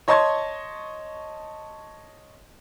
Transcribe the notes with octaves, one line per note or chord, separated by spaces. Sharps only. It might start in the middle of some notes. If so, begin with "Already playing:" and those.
C#5 D#5 A5 C6 C#6 G#6